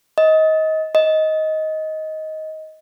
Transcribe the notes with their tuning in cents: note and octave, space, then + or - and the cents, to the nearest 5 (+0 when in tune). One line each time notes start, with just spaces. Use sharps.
D#5 +25
D#5 +15